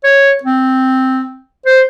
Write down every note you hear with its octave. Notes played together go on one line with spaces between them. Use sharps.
C#5
C4
C5